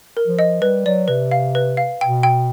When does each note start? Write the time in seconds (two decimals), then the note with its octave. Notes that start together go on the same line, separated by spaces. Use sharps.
0.17 A#4
0.28 F3
0.39 D#5
0.62 G3 B4
0.86 F#3 D5
1.08 C3 B4
1.31 F5
1.55 B4
1.77 F5
2.01 B2 G5
2.23 G5